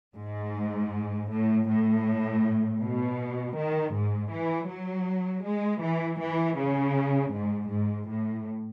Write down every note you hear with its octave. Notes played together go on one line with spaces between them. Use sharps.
G#2
A2
A2
B2
D#3
G#2
E3
F#3
G#3
E3
E3
C#3
G#2
G#2
A2